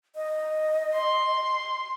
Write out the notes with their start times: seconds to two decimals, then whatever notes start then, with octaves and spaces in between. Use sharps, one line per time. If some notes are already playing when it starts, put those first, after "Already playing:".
0.16 D#5
0.95 C6